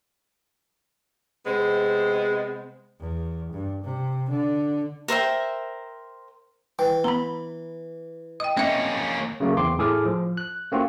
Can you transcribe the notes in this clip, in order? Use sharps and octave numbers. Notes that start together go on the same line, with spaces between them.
C3 G#3 B3 C5
E2
G2
C3
D3
A#4 C5 E5 G5
E3 G5
B3 A#5 B5
D#5 G5 D#6
A#3 C4 C#4 D#5 E5
C#3 F#3 A3 A#3
E2 C4 C6 D6
A2 G#4 A4 D6 F6
F3
F#6
A3 A#3 C4 C#4 F4 F#4